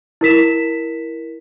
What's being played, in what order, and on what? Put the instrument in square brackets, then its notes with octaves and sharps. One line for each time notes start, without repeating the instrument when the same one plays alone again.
[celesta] E4 A#4 B6 E7